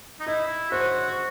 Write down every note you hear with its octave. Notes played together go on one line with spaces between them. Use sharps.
D#4
E4 D#5
F#4 C5